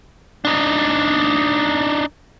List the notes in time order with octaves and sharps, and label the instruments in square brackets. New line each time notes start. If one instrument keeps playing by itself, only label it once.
[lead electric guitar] D4 D#4